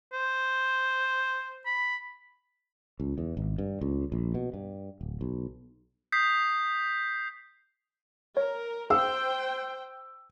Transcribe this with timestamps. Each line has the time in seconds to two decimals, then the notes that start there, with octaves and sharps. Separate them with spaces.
0.13 C5
1.66 B5
3.00 C#2
3.18 E2
3.37 G#1
3.58 G2
3.81 C#2
4.12 A#1
4.34 B2
4.54 G2
5.01 D1
5.21 B1
6.12 D#6 G6 B6 C7
8.37 A#4 C#5
8.90 G#4 C5 F5 G5 E6